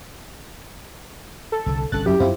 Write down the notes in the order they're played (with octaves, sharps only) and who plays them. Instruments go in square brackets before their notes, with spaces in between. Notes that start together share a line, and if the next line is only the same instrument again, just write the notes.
[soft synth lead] A4
[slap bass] C2 D3
[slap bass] G1 C2 C#4 [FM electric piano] A4 A6 [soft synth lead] F#6
[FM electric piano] F#2 E4 [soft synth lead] G4
[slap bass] F#2 F#3 [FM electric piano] C4 E4 F4